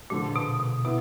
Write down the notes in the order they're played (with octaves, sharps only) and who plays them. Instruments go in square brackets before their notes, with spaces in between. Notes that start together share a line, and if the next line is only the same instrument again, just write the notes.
[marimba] A#2 [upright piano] D3 F3 G#3
[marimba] B2
B2
[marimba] B2 [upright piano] B3 E4